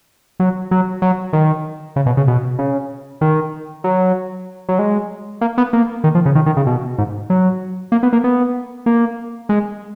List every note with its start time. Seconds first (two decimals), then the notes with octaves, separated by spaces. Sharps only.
0.40 F#3
0.71 F#3
1.02 F#3
1.33 D#3
1.96 C#3
2.06 B2
2.17 C#3
2.28 B2
2.59 C#3
3.21 D#3
3.84 F#3
4.69 F#3
4.79 G#3
5.41 A#3
5.58 B3
5.73 A#3
6.04 D#3
6.15 F3
6.26 C#3
6.35 D#3
6.46 D#3
6.57 C#3
6.67 B2
6.98 G#2
7.30 F#3
7.92 A#3
8.03 B3
8.13 A#3
8.24 B3
8.86 A#3
9.49 G#3